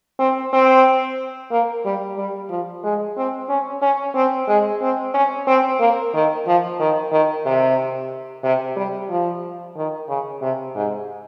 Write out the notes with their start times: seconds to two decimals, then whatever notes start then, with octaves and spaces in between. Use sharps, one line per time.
0.19 C4
0.53 C4
1.51 A#3
1.85 G3
2.17 G3
2.50 F3
2.84 G#3
3.17 C4
3.49 C#4
3.82 C#4
4.15 C4
4.48 G#3
4.82 C4
5.14 C#4
5.47 C4
5.80 A#3
6.14 D#3
6.47 F3
6.80 D#3
7.11 D#3
7.46 C3
8.43 C3
8.76 G3
9.10 F3
9.76 D#3
10.08 C#3
10.41 C3
10.75 G#2